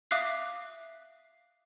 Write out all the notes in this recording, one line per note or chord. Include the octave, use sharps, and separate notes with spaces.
E5 F5 D6 D#6 F#6 C7